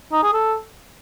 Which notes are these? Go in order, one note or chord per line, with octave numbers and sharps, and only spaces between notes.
D#4
G#4
A4